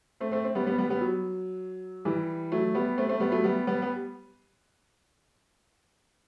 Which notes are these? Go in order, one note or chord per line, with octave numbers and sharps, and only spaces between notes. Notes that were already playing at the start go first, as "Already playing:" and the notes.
A3 C4
A3 C4
C4
G3 B3
G3 B3
G3 B3
G3 B3
F#3
E3 G3
F#3 A3
G3 B3
A3 C4
A3 C4
G3 B3
F#3 A3
G3 B3
G3 B3
B3